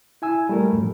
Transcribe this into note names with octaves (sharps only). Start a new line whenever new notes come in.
E4 G#5 E6
G3 A3 A#4
F#2 A2 F3